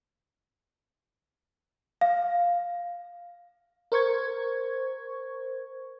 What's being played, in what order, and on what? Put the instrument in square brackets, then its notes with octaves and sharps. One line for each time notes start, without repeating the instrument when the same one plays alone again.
[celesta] F5
[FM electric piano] A#4 C5 C#6 G#6